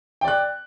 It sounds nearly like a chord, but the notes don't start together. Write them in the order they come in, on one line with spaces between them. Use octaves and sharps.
G5 D5 F#6